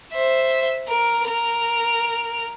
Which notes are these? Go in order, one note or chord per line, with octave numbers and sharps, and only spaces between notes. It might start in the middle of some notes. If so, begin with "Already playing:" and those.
C5 E5
A#4
A#4 F7